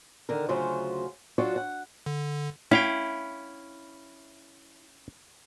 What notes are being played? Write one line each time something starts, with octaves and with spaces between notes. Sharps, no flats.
D3 D#3 A#4
D2 C#3 F#3 C#4 F4 C5
F#3 D4 F4 F#4 C#5
F#5
D3
C#4 E4 F5 G5